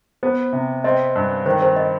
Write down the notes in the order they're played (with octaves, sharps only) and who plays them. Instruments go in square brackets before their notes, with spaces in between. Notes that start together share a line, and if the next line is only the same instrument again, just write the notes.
[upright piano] B3 [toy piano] C5
[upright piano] C3
[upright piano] C4 [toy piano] D#5
[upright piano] G2
[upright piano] D#3 [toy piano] C5
[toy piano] C5
D#5